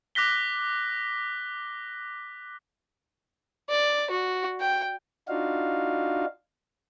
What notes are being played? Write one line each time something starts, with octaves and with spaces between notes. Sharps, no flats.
D6 F#6 A#6 B6 G7
D5
F#4
G5
D4 D#4 F4 F#4 F5